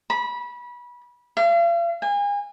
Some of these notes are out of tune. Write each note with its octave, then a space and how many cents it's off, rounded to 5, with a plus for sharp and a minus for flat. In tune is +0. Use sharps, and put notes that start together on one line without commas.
B5 -25
F5 -40
G#5 -35